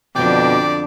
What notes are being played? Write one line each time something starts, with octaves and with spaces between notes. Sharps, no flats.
F2 B2 D3 D4 D5 G5